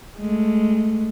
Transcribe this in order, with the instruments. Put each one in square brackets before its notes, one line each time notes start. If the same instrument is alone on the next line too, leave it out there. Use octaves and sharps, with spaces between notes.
[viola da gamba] G#3 A3